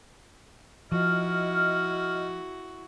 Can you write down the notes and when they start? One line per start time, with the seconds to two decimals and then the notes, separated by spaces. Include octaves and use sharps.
0.92 F3 E4 F#4 D#5 F6